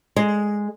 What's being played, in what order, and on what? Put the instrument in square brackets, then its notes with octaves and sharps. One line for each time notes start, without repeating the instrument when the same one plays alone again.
[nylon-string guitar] G#3